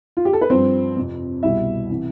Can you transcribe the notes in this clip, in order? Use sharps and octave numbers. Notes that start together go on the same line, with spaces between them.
F4
G4
A4
B4
G2 F3 C4 C5
F2 C3 F3
C2 B2 G3 E4 E5
C3 E3